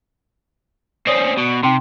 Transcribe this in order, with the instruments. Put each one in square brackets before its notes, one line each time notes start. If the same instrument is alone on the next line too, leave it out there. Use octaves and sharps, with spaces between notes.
[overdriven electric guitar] C4 C#4 [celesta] D5 D#6
[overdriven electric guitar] B2
[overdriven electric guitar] C3 [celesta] D#4 G5 C6